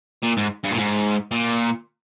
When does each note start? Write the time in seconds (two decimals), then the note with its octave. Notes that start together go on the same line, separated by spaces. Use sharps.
0.23 A#2
0.37 G#2
0.64 G2
0.71 A#2
0.78 G#2
1.31 A#2